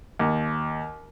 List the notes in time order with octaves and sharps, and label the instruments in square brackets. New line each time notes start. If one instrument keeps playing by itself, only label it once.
[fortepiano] D#2